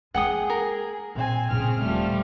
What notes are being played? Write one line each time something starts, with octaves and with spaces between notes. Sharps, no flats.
G#3 A#3 G#4 F#5 G5 D#6
A#4
A#2 C4 G#5
A#2 C#3 G#3 C4 G#4 F6
D#1 F3 G3 A3